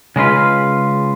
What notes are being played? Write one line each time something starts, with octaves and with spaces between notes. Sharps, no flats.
C#3 G#3 F4 B4